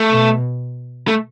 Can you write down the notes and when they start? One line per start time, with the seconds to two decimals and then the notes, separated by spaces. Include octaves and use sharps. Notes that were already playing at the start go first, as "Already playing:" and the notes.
Already playing: A3
0.10 B2
1.08 A3